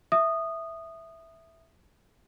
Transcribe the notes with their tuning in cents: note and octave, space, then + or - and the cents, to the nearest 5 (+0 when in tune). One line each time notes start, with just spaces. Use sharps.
E5 +0 D#6 -15